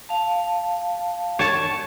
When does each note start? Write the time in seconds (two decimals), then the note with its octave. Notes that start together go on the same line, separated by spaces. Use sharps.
0.09 F5 A5
1.39 C#5 A5